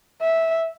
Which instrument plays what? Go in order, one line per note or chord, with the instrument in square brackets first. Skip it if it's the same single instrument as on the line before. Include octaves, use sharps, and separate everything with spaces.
[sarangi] E5